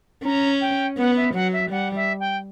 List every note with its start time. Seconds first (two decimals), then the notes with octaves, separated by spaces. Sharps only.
0.25 C#4 A#5
0.61 G5
0.98 B3 F#5
1.16 E5
1.34 F#3 F#5
1.52 E5
1.71 G3 F#5
1.95 E5
2.20 G5